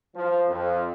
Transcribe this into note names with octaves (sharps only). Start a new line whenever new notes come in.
F3
F2